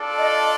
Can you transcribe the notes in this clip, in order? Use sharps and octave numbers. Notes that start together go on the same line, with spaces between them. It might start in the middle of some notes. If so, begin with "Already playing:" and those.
Already playing: D4 F4 A4 D5
D#5